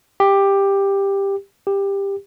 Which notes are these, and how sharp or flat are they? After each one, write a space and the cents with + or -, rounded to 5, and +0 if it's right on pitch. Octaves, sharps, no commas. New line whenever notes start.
G4 +10
G4 +15